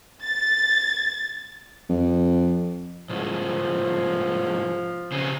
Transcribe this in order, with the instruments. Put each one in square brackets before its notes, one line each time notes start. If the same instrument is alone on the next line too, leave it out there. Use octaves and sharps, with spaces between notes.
[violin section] A6
[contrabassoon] F2
[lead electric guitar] C2 G#2 [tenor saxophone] F3
[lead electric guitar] C#3 C4